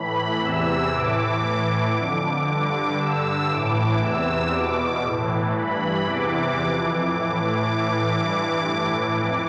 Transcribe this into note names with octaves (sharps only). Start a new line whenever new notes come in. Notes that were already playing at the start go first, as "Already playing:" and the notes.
Already playing: A2 E3 B5
E2 C3 E3 E6
A2 E3 D6
A2 E3
F2 D3
G2 D3 D6
G2 D3 E6
A2 E3 D6
E2 C3 E3 E6
E2 B2 D6
A2 E3
G2 E3 B5
E2 C3 E3 D6
F2 E3
A2 E3 D6
A2 E3 D6
G2 E3 D6
A2 E3
F2 E3